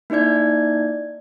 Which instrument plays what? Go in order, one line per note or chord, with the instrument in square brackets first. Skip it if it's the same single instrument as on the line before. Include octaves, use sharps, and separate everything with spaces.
[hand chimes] A#3 D#4 E4 D5 G#6